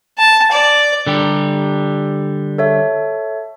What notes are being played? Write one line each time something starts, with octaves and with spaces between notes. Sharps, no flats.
A5
D5
D3 G3 G4
A4 C#5 E5